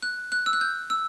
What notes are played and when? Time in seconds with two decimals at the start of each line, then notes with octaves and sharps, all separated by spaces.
0.02 F#6
0.32 F#6
0.46 E6
0.53 F#6
0.61 G6
0.90 E6